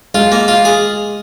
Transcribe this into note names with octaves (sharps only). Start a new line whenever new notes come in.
G#3 F4
A#3
F4
G#4